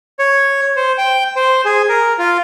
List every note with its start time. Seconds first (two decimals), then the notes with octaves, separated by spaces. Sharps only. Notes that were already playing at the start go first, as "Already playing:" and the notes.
0.19 C#5
0.76 C5
0.98 G5
1.36 C5
1.65 G#4
1.89 A#4
2.19 F4